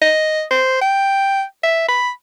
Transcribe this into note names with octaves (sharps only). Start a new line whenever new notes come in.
D#5
C5
G5
E5
B5